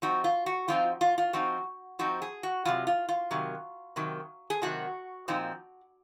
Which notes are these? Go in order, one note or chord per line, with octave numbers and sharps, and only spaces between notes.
F3 C4 D#4 F#4
F4
F#4
F3 C4 D#4 F4
F4
F4
F3 C4 D#4 F#4
F3 C4 D#4 F#4
G#4
F#4
C3 D#3 F#3 F4
F4
F4
C3 D#3 F#3
C3 D#3 F#3
G#4
C3 D#3 F#3 F#4
A#2 F3 C4 D#4